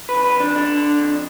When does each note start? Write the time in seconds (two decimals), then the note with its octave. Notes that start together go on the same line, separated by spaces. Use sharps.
0.09 F2 B4
0.24 B4
0.35 F2 D4
0.55 D3 D4
0.77 D3
0.98 F2